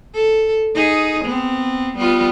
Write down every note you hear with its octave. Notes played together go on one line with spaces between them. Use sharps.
A4
D#4 G#4
B3 C4
G3 B3 F4